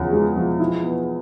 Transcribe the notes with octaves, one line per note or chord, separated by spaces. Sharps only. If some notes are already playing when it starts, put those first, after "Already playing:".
Already playing: E2 C#3 F3
G#3
F3
E4
B3